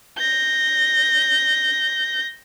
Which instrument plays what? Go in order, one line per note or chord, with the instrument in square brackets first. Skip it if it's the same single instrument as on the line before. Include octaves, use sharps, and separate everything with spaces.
[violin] G6 A#6